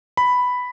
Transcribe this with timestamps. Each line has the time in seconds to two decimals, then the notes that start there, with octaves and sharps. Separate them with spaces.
0.17 B5